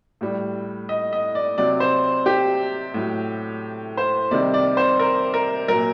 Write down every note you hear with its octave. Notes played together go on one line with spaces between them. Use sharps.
A2 G3
D#5
D#5
D5
C3 F#3 D5
C5
G4
A2 F#3
C5
C3 D#3 G3 D5
D5
C5
A#4
A#4
A#2 F#3 A#4